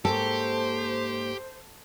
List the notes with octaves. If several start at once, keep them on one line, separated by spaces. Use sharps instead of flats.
G#2 A#3 G4 A4 C5 C#5